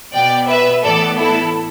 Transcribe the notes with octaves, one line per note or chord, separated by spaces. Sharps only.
B2 B3 D5 G5
B4 E5
A2 E3 B3 A4 D5
E4 A4